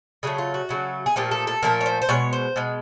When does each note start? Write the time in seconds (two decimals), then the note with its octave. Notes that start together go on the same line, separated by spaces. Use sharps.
0.23 C#3 F#3 A3 G#4
0.38 F4
0.54 F#4
0.69 C#3 F#3 A3
1.06 G#4
1.16 A#2 F3 A3 G4
1.31 A4
1.47 A4
1.63 A#2 F3 A3 A#4
1.81 C#5
1.86 C5
2.02 C5
2.09 B2 G#3 C#5
2.33 C5
2.56 B2 G#3